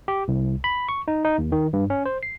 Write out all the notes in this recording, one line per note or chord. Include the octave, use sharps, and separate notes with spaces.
G4
C2
B5
C#6
D#4
D#4
D#2
D#3
G2
C#4
C5
C7